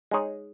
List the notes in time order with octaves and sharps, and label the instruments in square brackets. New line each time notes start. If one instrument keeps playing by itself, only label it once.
[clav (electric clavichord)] G#3 D#4 G#4 C#5